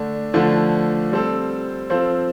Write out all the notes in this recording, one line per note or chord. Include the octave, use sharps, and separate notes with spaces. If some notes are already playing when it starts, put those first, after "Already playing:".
Already playing: D3 A3 D4
D3 F3 A3 D4
G3 C4 A4 C5
F3 C4 F4 A4 C5